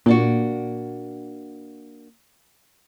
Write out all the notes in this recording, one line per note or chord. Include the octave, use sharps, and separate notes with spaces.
A#2 A#3 D4 F#4